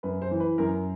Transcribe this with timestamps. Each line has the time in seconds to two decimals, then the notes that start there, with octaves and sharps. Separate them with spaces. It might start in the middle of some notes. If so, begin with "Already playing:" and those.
0.03 F#2 B4
0.22 C5
0.31 E3
0.40 B4
0.58 F#2 A#4